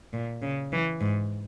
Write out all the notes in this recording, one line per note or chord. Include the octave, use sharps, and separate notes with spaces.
A#2
C#3
E3
G#2